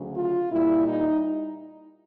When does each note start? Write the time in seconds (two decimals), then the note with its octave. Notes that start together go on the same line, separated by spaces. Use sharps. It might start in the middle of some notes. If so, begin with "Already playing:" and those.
Already playing: D2 C#3 F#3
0.16 F4
0.51 A#2 G3 E4
0.86 D#4